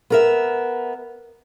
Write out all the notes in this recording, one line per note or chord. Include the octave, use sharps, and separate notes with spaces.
B3 A#4 E5